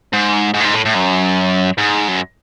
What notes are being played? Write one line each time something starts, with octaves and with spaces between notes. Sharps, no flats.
G#2
G#2
A2
G#2
A2
A2
F#2
G#2
F#2